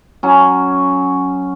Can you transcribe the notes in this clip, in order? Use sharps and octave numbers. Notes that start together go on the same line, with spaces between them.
F#3 C#4